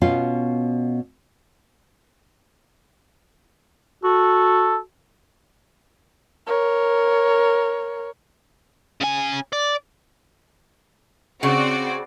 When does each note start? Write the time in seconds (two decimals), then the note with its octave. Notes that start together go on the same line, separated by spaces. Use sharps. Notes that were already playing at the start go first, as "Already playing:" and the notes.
0.01 B2 B3 C#4 F4
4.04 F#4 A4
6.47 A#4 C#5
9.01 C#3 G#5
9.53 D5
11.43 C#3 C4 F#4 D5